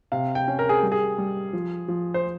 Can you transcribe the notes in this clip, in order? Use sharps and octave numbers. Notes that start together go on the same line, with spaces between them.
C3 F5
G5
C#4
A#4
G#4
G3
G#4
G3
F3
F3
C5